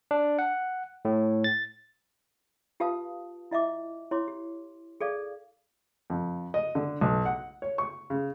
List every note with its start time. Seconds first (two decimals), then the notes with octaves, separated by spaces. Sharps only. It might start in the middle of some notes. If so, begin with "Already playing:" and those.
0.11 D4
0.39 F#5
1.05 A2
1.44 A6
2.80 F4 G4 B4 F5 A5 D#6
3.51 E4 D#5 E5 D6
4.11 E4 C#5 C6 D6
4.28 G4
5.01 G#4 A4 D5 F5
6.10 F2
6.54 D#5
6.75 D3
7.01 B1
7.25 F#5
7.62 C#5
7.78 C#6
8.10 C#3